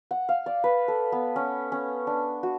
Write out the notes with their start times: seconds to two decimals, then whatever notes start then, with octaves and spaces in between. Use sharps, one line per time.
0.11 F#5
0.29 F5
0.46 D5
0.64 B4
0.88 A4
1.12 B3
1.36 C#4
1.72 C#4
2.07 D4
2.43 F#4